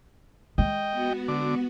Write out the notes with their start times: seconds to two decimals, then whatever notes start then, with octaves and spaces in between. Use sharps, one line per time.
0.58 G#3 D#5 G5
0.90 B3 F#4
1.28 D3 D6